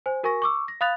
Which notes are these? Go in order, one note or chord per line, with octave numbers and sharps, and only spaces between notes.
C5 G#5
F#4 A#4 G#5 C#6 A#6
C#6 D6 E6
A#6
F5 B5 D#6 F#6 A6 F7